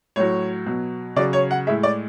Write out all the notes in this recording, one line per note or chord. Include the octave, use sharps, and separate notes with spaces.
A2 F#3 C#5
B2 F#3
C#3 F#3 D5
C#5
F#5
A2 G#3 E5
D5